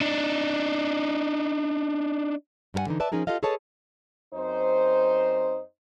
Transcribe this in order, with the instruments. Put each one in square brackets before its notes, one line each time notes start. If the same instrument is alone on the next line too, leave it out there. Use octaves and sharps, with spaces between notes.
[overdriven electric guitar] D4 D#4
[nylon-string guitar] G2 G3 A#4 F#5 G#5
D3 E3 D#4
B4 D5 E5 A5
F3 C#4 D#4 G#4 A#4
F4 G4 A4 D#5 F5
G#4 A4 B4 C#5 D#5 A5
[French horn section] F#2 C4 D#4 C5